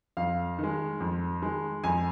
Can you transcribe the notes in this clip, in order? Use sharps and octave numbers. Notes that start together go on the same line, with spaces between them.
F2 F5
D#3 G#3
F2
D#3 G#3
F2 G#5